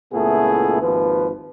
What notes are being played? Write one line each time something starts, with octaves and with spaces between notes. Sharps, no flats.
C#2 A#2 A3 B3 E4 G#4
G#1 D#2 F3 B4